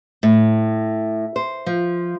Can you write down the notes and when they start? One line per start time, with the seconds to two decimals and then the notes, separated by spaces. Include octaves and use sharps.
0.23 A2
1.36 C5
1.66 F3